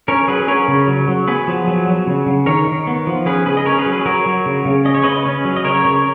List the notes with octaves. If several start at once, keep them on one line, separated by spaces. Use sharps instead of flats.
C#4 A#4 C#5
F#3 G#4 B4
C#4 A#4 C#5
C#3
F#3
F#3
B3 G#4 B4
F3
F#3
F#3
C#3
C#3
D#3 A#4 C#5
D#3
B3
F3
C#4 G#4 B4
C#3 G#4 B4
D#5
C#4 A#4 C#5
G#4 B4
F#3
G#4 B4
F#3 A#4 C#5
F#3
C#3
C#3
C#4 D#5
C#5
C#3 B4 D#5
C#4
F#3
D#5
C#3 A#4 C#5
C#3